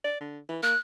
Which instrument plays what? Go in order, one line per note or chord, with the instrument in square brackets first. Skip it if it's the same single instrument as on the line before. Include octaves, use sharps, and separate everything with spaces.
[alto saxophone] D5
D3
E3
[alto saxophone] A#3 [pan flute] F#6